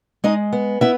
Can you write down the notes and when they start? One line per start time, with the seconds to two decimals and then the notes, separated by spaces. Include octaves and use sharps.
0.24 G#3 D#4 D#5
0.53 B3
0.81 B3 E4 E5